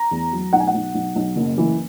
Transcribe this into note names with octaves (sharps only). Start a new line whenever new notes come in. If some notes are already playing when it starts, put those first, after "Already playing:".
Already playing: A#5
E2
F#3
B1 F#5
G#5
F#5
B1
B1
B1
F#1
E3